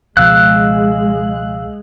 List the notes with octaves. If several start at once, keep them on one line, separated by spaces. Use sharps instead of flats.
C#2 B2 F3 G#3 F5 E6 F#6